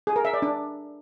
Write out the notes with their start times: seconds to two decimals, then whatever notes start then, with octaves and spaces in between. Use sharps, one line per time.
0.07 G#4
0.16 A#4
0.25 E5
0.34 D5
0.42 D4